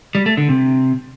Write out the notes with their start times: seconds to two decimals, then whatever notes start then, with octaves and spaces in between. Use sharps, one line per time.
0.15 G3
0.26 A3
0.37 D3
0.49 C3